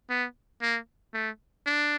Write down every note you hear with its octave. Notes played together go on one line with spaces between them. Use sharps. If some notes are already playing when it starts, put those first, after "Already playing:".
B3
A#3
A3
D4